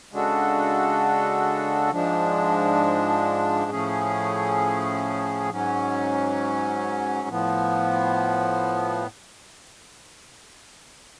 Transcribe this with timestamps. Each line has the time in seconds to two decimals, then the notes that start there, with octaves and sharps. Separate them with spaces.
0.12 C#3 G#3 D4 F#4 A4
1.92 G#2 F3 G#3 D4
3.71 A2 F3 A3 C#4 G#4
5.50 G#2 F#3 C#4
7.28 A2 F3 B3